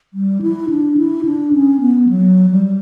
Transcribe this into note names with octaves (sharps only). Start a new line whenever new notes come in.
G3
E4
D4
E4
D4
C#4
B3
F#3
G3